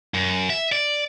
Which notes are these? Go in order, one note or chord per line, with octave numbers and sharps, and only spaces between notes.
F#2
E5
D5